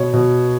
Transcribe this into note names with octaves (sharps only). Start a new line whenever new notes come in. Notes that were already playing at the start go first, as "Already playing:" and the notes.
Already playing: B2 C#5
B2